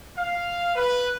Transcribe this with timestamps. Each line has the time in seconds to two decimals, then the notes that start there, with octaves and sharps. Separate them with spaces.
0.18 F5
0.76 B4